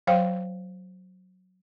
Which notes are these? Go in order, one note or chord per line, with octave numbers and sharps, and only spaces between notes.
F#3 C5 F5 G5